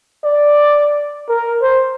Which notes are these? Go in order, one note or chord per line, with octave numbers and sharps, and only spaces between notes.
D5
A#4
C5